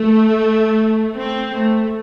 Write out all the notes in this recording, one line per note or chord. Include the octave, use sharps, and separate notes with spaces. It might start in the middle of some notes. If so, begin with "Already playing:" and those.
Already playing: A3
C4
A3